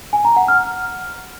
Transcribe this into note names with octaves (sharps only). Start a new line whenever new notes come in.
G#5
A#5
F#5
F6